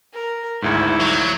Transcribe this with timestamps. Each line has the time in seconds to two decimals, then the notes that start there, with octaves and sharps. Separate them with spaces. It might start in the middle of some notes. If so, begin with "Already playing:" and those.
0.13 A#4
0.62 G#1 D2 G#2 E4
1.01 F#3